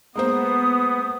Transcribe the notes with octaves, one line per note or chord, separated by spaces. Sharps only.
G#3 A#3 B3 C5 D#6